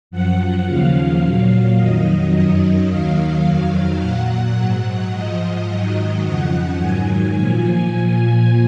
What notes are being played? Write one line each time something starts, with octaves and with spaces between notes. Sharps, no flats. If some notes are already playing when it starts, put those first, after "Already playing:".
F#2 F3 F#5
D#2 C#3 F3 F5
A#2 F#3 F5
F2 D#3 F#3 D#5
F#2 D#3 F#3
D#2 D#3 F#3 F5
F2 D#3 F#3
A#2 F#3 F#5
G#2 F#3 F#5
G#2 F3 D#5
G#2 D#3 F#3
F2 C#3 F3 F#5
G#2 D#3 F#3 G#5
A#2 F3